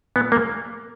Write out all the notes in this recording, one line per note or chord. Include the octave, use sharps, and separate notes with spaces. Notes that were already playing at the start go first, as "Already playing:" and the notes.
A#2 B3
A#3